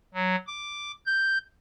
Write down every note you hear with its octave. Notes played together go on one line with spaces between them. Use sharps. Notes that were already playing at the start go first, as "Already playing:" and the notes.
F#3
D6
G6